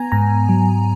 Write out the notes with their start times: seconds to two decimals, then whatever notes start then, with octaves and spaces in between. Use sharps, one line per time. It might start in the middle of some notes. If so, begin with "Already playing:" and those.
Already playing: B3 G#5 A#5
0.12 G#2 A#5
0.49 F#3